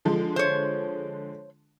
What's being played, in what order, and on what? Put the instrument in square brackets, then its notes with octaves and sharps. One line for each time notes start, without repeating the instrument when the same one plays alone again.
[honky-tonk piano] D3 F3 G#3
[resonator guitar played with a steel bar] C5 C#5